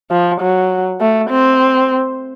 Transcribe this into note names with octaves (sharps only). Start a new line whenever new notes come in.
F3
F#3
A3
C4